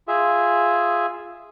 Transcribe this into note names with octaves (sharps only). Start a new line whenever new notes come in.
F4 G#4 E5